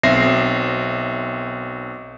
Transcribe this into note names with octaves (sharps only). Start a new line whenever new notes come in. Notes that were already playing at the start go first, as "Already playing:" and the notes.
B1 C4 E5 A#6 C7